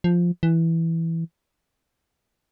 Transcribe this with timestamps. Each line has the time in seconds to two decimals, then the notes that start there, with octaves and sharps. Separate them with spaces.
0.04 F3
0.43 E3